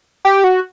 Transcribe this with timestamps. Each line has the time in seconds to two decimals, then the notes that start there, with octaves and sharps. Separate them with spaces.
0.25 G4
0.44 F#4